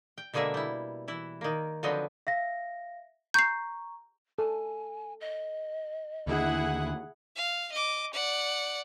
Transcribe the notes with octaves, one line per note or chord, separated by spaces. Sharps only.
G5
B2 D3 G#3 A#3 G#4 E5
G3 E4
E3 E4
D#3 A#3
D3 F3 F#3 B3 C4 D#5
E5 F5 A#6
A#5 C#6 G6 C7
A4 G#5
D#5
D#2 D3 E4 G#4 F#5
F5
D#5 D6
D5 F#5